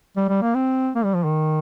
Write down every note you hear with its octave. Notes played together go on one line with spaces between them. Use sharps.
G3
G3
A#3
C4
A#3
G3
F3
D#3